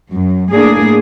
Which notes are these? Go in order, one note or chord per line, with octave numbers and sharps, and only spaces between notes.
F#2
A2 A#3 D4 G#4